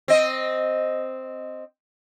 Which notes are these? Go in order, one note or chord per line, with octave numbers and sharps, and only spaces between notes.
C4 D#5